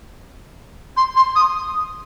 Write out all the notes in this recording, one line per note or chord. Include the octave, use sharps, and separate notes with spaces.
C6
C6
D#6